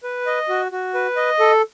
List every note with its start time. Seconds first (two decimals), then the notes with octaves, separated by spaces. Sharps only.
0.03 B4
0.26 D#5
0.49 F#4
0.72 F#4
0.94 B4
1.17 D#5
1.40 A4